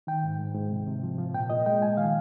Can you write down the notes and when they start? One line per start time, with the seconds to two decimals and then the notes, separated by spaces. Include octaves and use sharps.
0.07 D#3 G5
0.24 G#2
0.39 G#2
0.55 G#2
0.71 C3
0.87 C3
1.03 F3
1.18 F3
1.34 A#2 G5
1.50 A#2 D#5
1.66 G#3 G5
1.82 A#2 G#5
1.97 D#3 F5